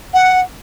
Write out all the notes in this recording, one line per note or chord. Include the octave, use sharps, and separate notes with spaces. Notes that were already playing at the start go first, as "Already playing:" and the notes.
F#5